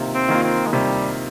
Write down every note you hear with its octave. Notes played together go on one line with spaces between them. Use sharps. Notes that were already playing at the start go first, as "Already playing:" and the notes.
Already playing: C3 D#3 A#3 F4
C4
D#3 A#3 F4
C4
G#3
C3 G3